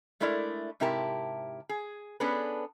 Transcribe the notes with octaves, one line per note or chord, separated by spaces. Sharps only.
G#3 A3 D4 E4 A#4 D5
G#2 C3 E4 G4 A#4 A5
G#4
B3 C#4 D4 G#4 A4 B4